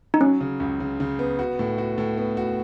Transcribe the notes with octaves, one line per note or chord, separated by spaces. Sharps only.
D#4
F#3 C#4
C#3
C#2
C#3
C#3
B3
F#4
A2
F#4
A2
B3
F#4